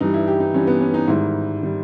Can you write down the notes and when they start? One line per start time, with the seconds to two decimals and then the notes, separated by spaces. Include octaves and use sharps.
0.01 G2 E3 G3 D#4
0.14 E4
0.27 G4
0.40 D#4
0.54 G2 E3 G3 C#4
0.67 B3
0.81 C#4
0.94 D#4
1.07 G#2 D#3 G3 E4
1.63 D#3 G3